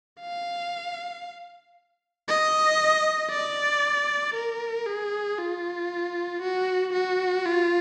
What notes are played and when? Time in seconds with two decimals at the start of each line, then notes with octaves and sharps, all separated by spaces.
0.21 F5
2.28 D#5
3.31 D5
4.35 A#4
4.86 G#4
5.38 F4
6.42 F#4
6.93 F#4
7.46 F4